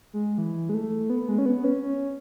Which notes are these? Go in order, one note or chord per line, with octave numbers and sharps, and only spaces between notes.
G#3
E3
G#3
A3
B3
G#3
C#4
B3
C#4
C#4